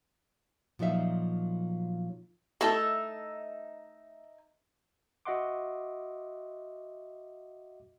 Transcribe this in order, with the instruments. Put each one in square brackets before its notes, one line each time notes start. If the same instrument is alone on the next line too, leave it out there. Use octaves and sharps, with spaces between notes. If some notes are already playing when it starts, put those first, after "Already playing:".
[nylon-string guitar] A#2 F3 F#3 D#4 E5 F5
[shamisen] A3 E4 A4 [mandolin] D#4 E5 A5
[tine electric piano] F#4 D#5 E5 F#5 C6 D6